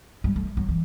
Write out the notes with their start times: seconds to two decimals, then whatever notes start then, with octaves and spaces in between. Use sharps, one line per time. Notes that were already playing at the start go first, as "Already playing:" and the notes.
0.24 G3
0.36 A3
0.57 F#3
0.69 E3